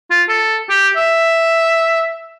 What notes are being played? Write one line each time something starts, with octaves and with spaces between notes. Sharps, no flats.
F4
A4
G4
E5